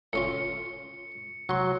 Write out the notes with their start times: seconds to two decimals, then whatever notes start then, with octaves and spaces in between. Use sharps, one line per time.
0.13 A2 C#4 F4 C#7
1.49 F#3 F#5 C6